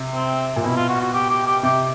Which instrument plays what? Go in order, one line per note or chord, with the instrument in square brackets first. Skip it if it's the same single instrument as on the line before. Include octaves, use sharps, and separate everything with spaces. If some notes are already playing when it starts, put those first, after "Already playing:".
Already playing: [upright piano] C3
[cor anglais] C4
[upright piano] A#2
[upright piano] B2 [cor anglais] E4
[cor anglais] F4
F#4
F#4
G4
G4
G4
[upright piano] C3 [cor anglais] G4